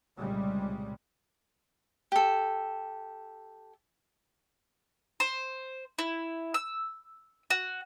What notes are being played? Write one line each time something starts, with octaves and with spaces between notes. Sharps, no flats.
C2 A#2 C#3 G3 G#3
G4 A4
C5
E4
E6
F#4